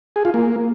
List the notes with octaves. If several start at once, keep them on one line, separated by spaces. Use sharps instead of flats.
G#4
F4
A#3